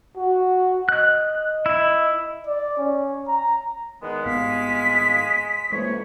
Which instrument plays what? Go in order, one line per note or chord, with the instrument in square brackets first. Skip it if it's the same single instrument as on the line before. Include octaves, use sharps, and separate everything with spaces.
[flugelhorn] F#4
[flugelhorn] D#5 [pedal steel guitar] F#6
[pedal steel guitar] E4
[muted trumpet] D5
C#4
A#5
[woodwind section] E2 D#3 B3 [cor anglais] G#3
[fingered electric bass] G#1 G#2 B3 [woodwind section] F5 [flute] B6
[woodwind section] F2 E3 C#5 [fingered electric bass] G#3 A#3